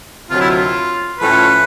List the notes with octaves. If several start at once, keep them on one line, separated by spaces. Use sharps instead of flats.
D2 C3 D#3 F#3 F4
E4
F4
A2 F3 A3 C#4 B4